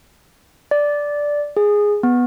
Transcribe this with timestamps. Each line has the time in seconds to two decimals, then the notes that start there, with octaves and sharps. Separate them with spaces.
0.71 D5
1.57 G#4
2.03 B3